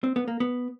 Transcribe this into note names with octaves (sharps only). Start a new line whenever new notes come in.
C4
B3
A#3
B3